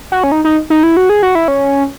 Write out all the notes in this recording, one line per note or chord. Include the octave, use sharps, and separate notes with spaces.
F#4
C#4
D#4
D#4
D#4
E4
F#4
G#4
F#4
E4
C#4